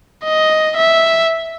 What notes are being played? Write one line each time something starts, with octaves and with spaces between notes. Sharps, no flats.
D#5
E5